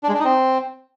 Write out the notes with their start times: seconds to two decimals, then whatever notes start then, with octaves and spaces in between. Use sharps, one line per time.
0.03 D4
0.09 G#3
0.14 D4
0.19 D#4
0.25 C4